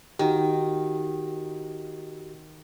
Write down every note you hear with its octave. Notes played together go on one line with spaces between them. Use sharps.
D#3 F#4 G4